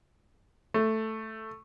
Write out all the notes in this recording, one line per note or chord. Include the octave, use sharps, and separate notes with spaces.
A3